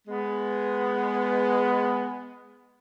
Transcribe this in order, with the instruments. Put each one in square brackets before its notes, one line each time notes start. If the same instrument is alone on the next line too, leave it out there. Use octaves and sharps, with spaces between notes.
[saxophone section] G#3 B3